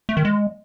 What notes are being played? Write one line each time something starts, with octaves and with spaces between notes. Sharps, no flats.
A3
D#3
G#3